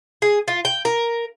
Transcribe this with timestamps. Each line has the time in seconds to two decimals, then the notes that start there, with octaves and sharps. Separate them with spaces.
0.22 G#4
0.48 F4
0.65 G5
0.85 A#4